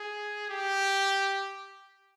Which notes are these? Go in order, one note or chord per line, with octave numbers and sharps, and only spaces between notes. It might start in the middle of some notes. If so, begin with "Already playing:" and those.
Already playing: G#4
G4